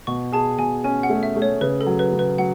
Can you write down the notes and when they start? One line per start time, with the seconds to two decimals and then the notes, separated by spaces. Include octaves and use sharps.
0.07 B2 C#6
0.32 G#4 A5
0.58 B2 G#5
0.84 C#4 G#5
1.03 F#5
1.10 A3
1.23 E5
1.36 A3
1.42 C#5
1.61 C#3 B4
1.81 A4
1.87 F#3
1.99 B4
2.12 C#3
2.19 B4
2.38 F#3 F#5